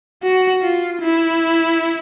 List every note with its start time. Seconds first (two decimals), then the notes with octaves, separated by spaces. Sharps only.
0.23 F#4
0.63 F4
1.01 E4